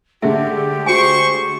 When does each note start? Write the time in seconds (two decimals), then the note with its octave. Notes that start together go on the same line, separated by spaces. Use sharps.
0.22 D3 G#3 A3 G4 E5
0.86 F#4 C5 G#5 C#6